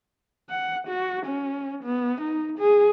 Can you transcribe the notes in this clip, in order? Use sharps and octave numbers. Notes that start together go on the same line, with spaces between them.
F#5
F#4
C#4
B3
D#4
G#4